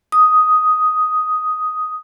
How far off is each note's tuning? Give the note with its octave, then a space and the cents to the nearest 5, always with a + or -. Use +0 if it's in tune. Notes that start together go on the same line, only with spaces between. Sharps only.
D#6 +5